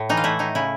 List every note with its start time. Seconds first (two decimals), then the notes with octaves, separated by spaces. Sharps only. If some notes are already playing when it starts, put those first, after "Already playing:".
Already playing: A2
0.09 E3 D#4
0.17 F4
0.24 A3 E4
0.39 A2 D#4
0.55 C#3 E4